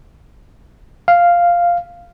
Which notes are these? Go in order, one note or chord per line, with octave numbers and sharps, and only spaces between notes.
F5